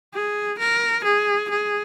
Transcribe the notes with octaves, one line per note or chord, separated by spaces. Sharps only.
G#4
A#4
G#4
G#4